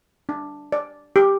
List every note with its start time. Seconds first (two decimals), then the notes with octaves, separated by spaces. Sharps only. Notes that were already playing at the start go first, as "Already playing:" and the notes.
0.29 D4
0.72 D5
1.16 G4